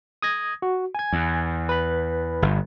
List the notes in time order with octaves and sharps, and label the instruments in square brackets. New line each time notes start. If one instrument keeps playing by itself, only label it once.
[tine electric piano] D#6 G#6 A#6
F#4
G#5 G#6
[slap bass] E2
[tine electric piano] B4 B5
[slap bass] G1